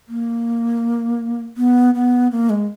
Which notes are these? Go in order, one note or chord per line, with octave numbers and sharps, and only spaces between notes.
A#3
B3
B3
A#3
G#3